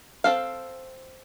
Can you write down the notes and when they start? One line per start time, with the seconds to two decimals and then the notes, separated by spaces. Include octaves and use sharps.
0.24 C4 A4 F5